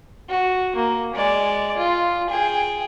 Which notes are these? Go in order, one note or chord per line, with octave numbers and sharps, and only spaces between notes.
F#4
A#3
G#3 D5
F4
G#4 G5